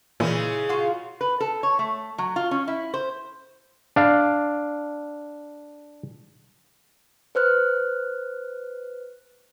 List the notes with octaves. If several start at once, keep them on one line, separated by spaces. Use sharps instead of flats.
A#2 C#3 E3 G#3 E4
F4 F#4
B4
A4
C#5
A3
F#3
F4
C#4
E4
C5
D4 F5
B4 C5 F6 F#6